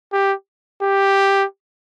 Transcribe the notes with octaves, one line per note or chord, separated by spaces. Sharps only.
G4
G4